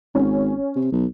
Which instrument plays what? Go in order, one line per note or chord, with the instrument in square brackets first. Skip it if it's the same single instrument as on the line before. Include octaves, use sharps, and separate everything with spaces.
[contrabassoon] G#1 [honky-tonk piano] C#4
[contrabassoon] C3
B1